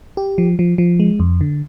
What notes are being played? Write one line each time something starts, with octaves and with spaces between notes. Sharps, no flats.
G4
F3
F3
F3
G#3
F2
D3